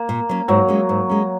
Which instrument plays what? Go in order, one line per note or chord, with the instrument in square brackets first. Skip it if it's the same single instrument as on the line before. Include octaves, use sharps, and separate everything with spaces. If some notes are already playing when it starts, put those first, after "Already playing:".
Already playing: [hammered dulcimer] A#3
[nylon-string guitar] A#2
F#3 C#4
[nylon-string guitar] G#2 [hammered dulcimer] F#3
[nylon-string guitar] G#3 C#4
G#2
G#3 C#4